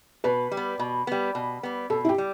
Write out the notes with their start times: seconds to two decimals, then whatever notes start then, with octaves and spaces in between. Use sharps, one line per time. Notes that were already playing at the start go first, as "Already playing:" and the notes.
0.24 B2 B4
0.51 G3
0.57 B3
0.79 B2
1.07 G3 B3
1.35 B2
1.63 G3 B3
1.90 B2 A4
2.05 E4
2.09 G4
2.18 G3